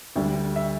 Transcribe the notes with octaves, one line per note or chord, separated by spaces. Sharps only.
D2 D3 G3 E5
E5